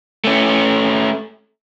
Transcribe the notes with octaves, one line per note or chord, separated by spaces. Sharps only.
A3 C#4